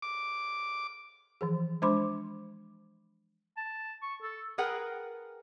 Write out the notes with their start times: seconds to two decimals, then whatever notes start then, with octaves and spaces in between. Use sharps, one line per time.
0.02 D6
1.41 E3 F3 G#4
1.82 G#3 D4 C5 B5 C6 D6
3.57 A5
4.02 C#6
4.22 A4
4.58 G#4 A#4 B4 F#5 G5